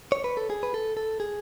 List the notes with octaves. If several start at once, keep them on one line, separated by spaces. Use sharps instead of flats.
C#5
B4
A4
G#4
B4
A4
A4
G#4